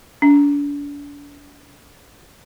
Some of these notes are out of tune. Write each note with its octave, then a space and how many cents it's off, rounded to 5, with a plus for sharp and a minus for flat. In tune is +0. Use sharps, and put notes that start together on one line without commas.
D4 -40